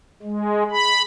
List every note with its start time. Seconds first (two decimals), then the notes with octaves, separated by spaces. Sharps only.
0.23 G#3
0.71 B5